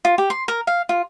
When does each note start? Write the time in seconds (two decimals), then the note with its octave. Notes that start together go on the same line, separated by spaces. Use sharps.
0.05 F4
0.18 G4
0.30 C6
0.48 A#4
0.67 F5
0.89 F4